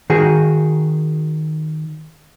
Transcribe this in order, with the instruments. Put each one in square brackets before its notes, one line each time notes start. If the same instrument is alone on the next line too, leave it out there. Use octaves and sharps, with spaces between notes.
[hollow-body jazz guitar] D#3 F#4 G#4